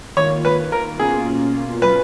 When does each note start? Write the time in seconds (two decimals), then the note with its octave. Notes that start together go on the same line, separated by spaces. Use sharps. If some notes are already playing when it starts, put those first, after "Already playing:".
0.17 D#3 A#3 F4 C#5
0.45 B4
0.72 A#4
0.99 B2 A#3 C#4 F4 G#4
1.82 F#3 C#4 F4 B4